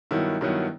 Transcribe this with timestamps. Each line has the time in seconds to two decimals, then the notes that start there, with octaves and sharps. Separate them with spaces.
0.11 G2 D#3 F#3 B3 E4
0.41 G2 D#3 F#3 B3 E4